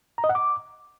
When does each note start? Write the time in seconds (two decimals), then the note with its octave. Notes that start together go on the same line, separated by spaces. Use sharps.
0.18 A#5
0.24 D#5
0.29 F#5
0.35 D6